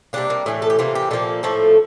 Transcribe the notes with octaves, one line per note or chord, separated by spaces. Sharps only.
C3 G3 A#3 D4
A#3
A2 E3 A3 A#3
A4
G4
C3 E3 A#3 F4
G4
A#2 F3 A#3 A4
A2 F3 A3 A4